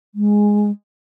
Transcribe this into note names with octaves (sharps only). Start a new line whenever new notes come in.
G#3